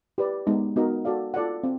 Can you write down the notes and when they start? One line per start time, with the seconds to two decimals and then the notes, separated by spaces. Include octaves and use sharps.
0.18 E4 G4 B4 D5
0.47 G#3 B3 D#4
0.76 B3 D#4 F#4 A#4 D#5
1.05 F#4 A4 D5 F5
1.34 F4 A4 D5 F#5
1.64 C4